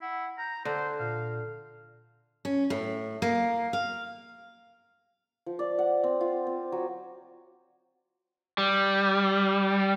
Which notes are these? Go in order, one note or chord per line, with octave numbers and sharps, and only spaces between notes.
E4 F#5
A#5 G6
D3 A4 C5
A#2 F5
C#4
A2
A#3
F5
F3
D5
F#5
C4
F4
C4
F#3
G3